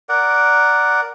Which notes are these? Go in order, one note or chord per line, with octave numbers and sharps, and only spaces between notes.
A#4 D5 F#5